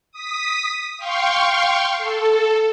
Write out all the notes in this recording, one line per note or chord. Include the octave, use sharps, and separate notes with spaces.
D#6 B6
F5 G5 C6 C#6
A4